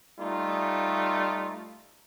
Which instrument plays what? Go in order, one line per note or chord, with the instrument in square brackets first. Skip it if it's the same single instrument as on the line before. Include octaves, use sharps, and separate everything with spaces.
[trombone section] G3 A3 D#4 F4